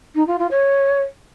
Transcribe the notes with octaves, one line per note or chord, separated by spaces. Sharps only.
D#4
F4
F4
C#5